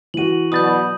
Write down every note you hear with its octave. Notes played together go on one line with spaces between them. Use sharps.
E3 F#4 D#7 F#7
B2 F#3 D5 B5 D#6 G6